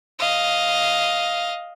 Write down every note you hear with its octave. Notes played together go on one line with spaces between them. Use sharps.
D#5 F5